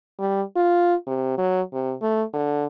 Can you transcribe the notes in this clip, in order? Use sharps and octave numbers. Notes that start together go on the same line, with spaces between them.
G3
F4
C3
F#3
C3
A3
D3